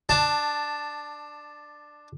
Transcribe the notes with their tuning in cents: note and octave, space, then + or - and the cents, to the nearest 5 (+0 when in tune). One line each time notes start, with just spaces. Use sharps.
D4 +15 A5 +0